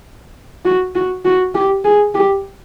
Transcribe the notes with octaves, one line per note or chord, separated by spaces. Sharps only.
F#4
F#4
F#4
G4
G#4
G4